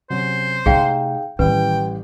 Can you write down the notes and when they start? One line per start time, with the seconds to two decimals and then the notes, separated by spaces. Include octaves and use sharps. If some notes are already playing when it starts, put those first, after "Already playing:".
0.10 C3 F#3 C#4 C5
0.66 C3 A3 D#4 G#4 F5 G5
1.39 A1 D#3 E3 G3 B4 G5